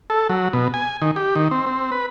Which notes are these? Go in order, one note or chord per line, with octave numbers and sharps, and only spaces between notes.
A4
F#3
B2
G#5
D#3
G4
D#3
C4
C4
B4